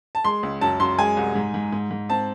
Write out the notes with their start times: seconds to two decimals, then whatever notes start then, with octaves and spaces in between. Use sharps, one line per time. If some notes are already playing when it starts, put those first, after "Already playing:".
0.15 A5
0.25 G#3 C6
0.43 C#2
0.61 F#2 A5
0.80 F#2 C6
0.99 G#3 G#5
1.17 C2
1.35 G#2
1.54 G#2
1.73 G#2
1.91 G#2
2.09 C4 A5